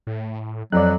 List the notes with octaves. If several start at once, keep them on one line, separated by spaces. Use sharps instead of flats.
A2
F2 F3 F#3 D5 F#6